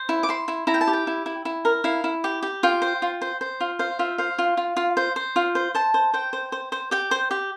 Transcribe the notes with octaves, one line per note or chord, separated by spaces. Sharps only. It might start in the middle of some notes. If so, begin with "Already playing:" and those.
Already playing: C5
E4
D6
E4 C6
E4
E4 A#5
G5
A5
G4
G5
E4
E4
E4
A#4
E4 F5
E4
G4
G4
F4 G5
C5
F4
C5
C5
F4
C5 F5
F4 E5
C5 F5
F4
F4
F4
C5
C5
F4
C5
C5 A5
C5
C5 G5
C5
C5
C5
G4 G5
C5
G4